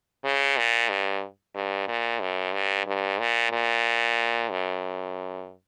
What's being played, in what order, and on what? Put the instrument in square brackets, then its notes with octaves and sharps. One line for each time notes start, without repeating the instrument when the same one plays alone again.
[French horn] C#3
A#2
G2
G2
A#2
F#2
G2
G2
A#2
A#2
F#2